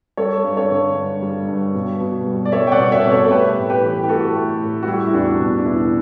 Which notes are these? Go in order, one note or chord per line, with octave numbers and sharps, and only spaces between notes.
G3 A4 C#5
G2
A4 C#5
D3
G2
G3
G2
B2
B2
G3
D5
G3 C#5 E5
G5
D5 F#5
B2
C#5 E5
B2
A4 C#5
A4
A3 G4 B4
A2
G4 B4
E3
G4
A2 F#4 A4
A3
A2
F#4
G3 E4 G4
E4
E2 D4 F#4
B2
D4
E2 E4